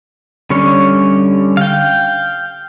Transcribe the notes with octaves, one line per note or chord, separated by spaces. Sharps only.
D3 G3 C#4 C#5
F5 G5